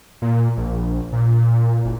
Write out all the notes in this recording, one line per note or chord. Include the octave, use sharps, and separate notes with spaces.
A#2
A#1
A#2
F#1